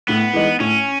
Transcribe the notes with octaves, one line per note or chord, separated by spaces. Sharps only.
A2 B3
E3 G#3 D#4
A2 C#4